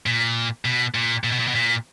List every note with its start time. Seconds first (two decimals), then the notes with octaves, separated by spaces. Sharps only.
0.06 A#2
0.65 B2
0.94 A#2
1.24 A#2
1.32 B2
1.40 A#2
1.48 B2
1.55 A#2